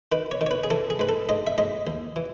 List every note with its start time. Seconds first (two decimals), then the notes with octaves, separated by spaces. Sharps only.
0.12 D#3 B4
0.31 C#5
0.41 D#3
0.46 C#5
0.51 B4
0.64 G#4
0.70 E3 A4
0.90 G#4
0.99 G#2 B4
1.09 A4
1.29 G#2 D#5
1.47 E5
1.58 G#2 D#5
1.87 D#2
2.16 E3